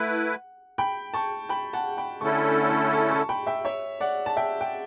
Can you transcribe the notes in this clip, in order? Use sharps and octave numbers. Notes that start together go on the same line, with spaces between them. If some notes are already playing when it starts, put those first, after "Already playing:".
Already playing: A3 E4 B4 F#5
G5 B5
A5 C#6
G5 B5
F#5 A5
G5 B5
D3 A3 C#4 E4 A4 A5 C#6
A5 C#6
A5 C#6
A5 C#6
G5 B5
E5 G5
C#5 E5
D5 F#5
A5
E5 G5
G5